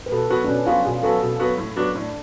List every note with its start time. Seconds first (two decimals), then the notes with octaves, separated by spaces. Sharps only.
0.06 B4
0.12 B2 A4
0.30 F#3 B3 F#4 B4
0.44 D4
0.48 B2 C#4
0.66 F#3 B3 F4 F#4
0.85 B2 G#4
1.03 F#3 B3 F#4 A4
1.22 B2
1.40 F#3 B3 F#4
1.58 A2
1.76 F#3 B3 D4 F#4
1.95 A2 D4